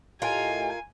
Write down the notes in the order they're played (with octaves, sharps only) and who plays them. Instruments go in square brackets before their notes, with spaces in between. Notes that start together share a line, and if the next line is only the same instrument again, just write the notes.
[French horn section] A2 G4 D#5 [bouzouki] F4 A#4 [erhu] G#5